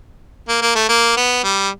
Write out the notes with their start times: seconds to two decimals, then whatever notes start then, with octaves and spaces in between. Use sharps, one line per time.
0.48 A#3
0.62 A#3
0.75 A3
0.89 A#3
1.17 B3
1.44 G3